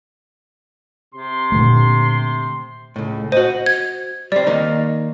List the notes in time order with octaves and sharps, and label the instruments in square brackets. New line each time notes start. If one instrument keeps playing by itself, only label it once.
[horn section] C3 C6
[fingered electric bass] A#2 D3 A3
[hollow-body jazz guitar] C#2 A2
[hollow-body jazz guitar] F#4 D#5 [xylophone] C5
[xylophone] G#6
[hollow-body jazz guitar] G3 C4 [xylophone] D5
[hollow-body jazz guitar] D#3 A#3 D#4